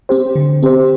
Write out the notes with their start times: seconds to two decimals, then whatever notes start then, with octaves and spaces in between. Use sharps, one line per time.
0.09 C4 G4 C5
0.36 D3
0.63 C4 G4 C5